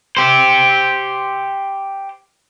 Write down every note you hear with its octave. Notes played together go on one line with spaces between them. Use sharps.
G4 C5